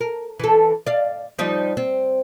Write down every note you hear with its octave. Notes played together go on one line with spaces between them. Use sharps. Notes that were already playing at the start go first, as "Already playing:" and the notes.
A#4
E3 A4
D5 F5
F3 G3 D#4
C4